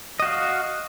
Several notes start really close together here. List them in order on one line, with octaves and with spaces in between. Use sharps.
D#5 F#4 F5